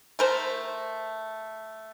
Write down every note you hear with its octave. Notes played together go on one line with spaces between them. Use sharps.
A3 A#4 C5